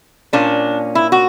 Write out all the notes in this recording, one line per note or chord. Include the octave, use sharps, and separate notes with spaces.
A#2 A#3 C#4 D4
E4
F#4